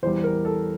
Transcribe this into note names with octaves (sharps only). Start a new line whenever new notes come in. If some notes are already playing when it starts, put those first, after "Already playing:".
E2 E3 G3 C5
A#4
A4